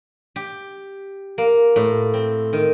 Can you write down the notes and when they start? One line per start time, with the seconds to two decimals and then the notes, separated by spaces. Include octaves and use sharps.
0.36 G4
1.38 A#3
1.76 A2
2.14 C4
2.53 D#3